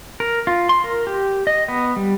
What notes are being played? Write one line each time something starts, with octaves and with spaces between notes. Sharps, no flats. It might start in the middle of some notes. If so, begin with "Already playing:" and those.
A#4
F4
C6
A#4
G4
D#5
B3
G3